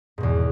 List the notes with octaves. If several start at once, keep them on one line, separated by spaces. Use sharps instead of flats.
E2 G#2 B2